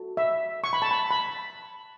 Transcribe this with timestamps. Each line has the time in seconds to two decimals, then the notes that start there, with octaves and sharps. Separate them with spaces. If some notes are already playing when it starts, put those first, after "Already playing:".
Already playing: F#4 A4
0.17 E5
0.64 C#6
0.73 B5
0.82 A5
0.91 B5
1.11 B5